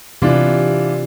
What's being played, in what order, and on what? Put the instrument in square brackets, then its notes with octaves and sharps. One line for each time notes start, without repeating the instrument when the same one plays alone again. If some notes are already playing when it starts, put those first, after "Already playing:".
[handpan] C3 [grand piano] E3 D4 F4